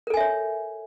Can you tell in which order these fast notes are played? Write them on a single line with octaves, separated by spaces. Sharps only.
A#4 A4 G#5 E5 C#5